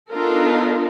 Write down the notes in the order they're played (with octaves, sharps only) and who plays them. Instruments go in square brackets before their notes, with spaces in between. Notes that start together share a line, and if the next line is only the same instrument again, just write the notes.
[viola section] B3 D4 D#4 F4 A4 A#4